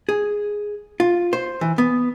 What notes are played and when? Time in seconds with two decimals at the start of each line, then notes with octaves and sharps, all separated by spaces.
0.09 G#4
1.00 F4
1.33 C5
1.61 E3
1.78 B3